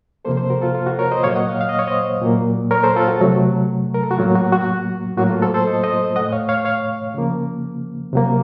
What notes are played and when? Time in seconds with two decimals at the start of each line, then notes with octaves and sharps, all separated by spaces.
0.25 C3 F3 A#3 A4 C5
0.37 A4 C5
0.50 F#4 A#4
0.61 F4 A4
0.75 F4
0.87 F#4
0.99 A#4 C#5
1.12 C5 D#5
1.23 A#2 F#3 A#3 C#5 F5
1.36 D#5 F#5
1.48 C#5 F5
1.61 F5
1.69 D#5
1.79 C#5
1.87 C5 D#5
2.22 A#2 F#3 A#3
2.71 A#4 C#5
2.83 A4 C5
2.96 F4 A4
3.08 F#4
3.20 C3 F#3 A3
3.94 A#4
4.03 A4
4.11 F#4
4.18 A2 F#3 A#3 F4
4.35 F#4
4.52 F#4
5.17 A2 F#3 A#3 F#4
5.30 F4 A4
5.42 A4 C5
5.54 A4 C5
5.67 C5 D#5
5.83 C5 D#5
6.16 A3 D#5 F#5
6.20 A2
6.32 C#5 F5
6.49 C#5 F5
6.65 C#5 F5
7.14 C#3 F3 A#3
8.13 C3 F#3 A#3